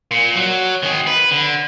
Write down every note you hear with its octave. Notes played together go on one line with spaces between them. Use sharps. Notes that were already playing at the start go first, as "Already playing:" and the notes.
A#2
F#3
D#3 G#4
B4
D3